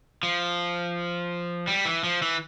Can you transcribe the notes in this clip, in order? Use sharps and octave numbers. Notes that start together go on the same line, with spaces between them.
F3
G3
E3
F3
E3